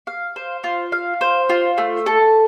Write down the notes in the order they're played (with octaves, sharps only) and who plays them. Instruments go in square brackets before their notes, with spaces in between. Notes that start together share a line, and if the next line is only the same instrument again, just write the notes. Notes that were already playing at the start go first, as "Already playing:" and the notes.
[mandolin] F5
C5
F4
F5
C5
F4
A3
A4